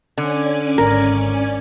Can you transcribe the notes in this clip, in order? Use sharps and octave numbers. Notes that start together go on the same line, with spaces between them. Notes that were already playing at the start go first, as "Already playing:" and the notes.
D3 C#4 D5 G#5
G#1 A#4